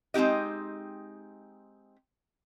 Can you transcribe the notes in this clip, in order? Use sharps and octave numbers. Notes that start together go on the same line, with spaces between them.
G#3 C4 D#4 G4 D#5